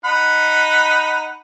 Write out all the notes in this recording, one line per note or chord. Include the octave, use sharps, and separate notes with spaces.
D#4 F#5 B5